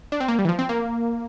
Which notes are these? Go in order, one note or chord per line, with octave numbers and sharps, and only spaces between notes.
D4
C4
A#3
G3
E3
F3
C4
A#3